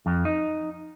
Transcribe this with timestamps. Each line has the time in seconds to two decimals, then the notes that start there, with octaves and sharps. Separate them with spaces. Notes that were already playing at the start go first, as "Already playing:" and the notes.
0.06 F2
0.25 D#4